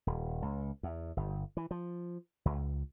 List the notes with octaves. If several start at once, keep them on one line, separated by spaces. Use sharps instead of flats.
D#1
C#2
E2
G1
E3
F3
C#2